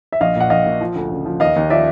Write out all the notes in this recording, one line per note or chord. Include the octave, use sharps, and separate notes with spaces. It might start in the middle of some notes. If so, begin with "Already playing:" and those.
E5
A#1 D#5 F5
A#2 F#5
A#1 D#5 F5
A#2
F3
D2
C#3
F3
D#2 D#5 F5
D#2
F3 D5 E5